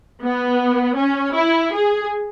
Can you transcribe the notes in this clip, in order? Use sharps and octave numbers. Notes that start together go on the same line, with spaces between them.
B3
C#4
E4
G#4